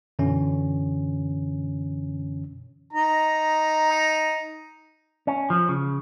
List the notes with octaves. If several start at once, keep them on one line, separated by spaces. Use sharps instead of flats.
F#2 B2 D3 E3 C#4
D#4 A#5
C#4
F3
C#3